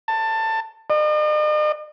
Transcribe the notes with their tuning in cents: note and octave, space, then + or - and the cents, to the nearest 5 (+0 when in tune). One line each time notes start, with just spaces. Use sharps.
A5 +20
D#5 -45